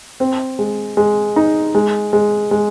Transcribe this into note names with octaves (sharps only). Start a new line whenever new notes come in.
C4
G#3
G#3
D#4
G#3
G#3
G#3